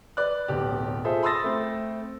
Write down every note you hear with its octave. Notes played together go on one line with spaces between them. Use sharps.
B4 D5 F#6
D1 B1 G4
F4 G#4 A4 C5 E5
B5 C6 D#6 E6 A6 A#6
A3 C4